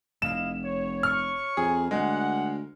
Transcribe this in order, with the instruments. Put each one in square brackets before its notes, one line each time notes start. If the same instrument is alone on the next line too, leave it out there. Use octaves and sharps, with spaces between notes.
[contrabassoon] F1 [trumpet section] E4 D#5 F5 [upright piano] E7
[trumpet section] C#5
[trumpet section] C#5 C#6 [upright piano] F6
[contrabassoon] F2 [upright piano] G#4
[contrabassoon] D2 [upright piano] G#3 [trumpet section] A#3 F#5